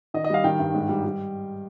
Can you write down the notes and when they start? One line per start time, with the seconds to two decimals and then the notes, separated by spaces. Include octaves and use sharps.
0.14 D#3 D#5
0.24 D#5
0.30 G3 F5
0.44 D#3 G5
0.59 G2
0.74 G#2
0.89 G3
1.04 G3